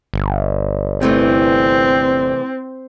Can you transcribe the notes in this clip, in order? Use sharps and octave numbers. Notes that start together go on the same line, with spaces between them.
G1
C3 E3 A3 C4